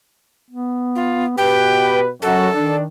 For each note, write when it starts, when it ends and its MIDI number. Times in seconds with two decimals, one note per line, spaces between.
0.50 1.35 59
0.95 1.25 65
1.38 2.11 47
1.38 2.03 67
1.38 2.11 71
1.38 1.99 79
2.22 2.49 42
2.22 2.49 54
2.22 2.49 66
2.22 2.76 69
2.55 2.87 51
2.55 2.82 62